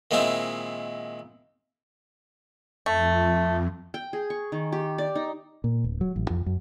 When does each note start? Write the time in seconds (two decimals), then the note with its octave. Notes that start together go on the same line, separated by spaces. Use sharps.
0.11 A#2 D#3 G#3 C4 E4 F5
2.86 F2 A3
3.94 G5
4.13 G#4
4.30 C#6
4.52 D#3
4.72 G4
4.98 D5
5.15 D#4
5.64 A#2
5.84 D1
6.01 F#3
6.16 A1
6.30 F2
6.46 F#2